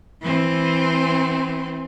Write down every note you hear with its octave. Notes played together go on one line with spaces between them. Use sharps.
E3 C4